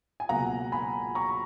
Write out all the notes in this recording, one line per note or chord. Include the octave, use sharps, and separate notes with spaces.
G#5
C#2 B2 F#3 A#3 F#5 A#5
G#5 B5
A#5 C#6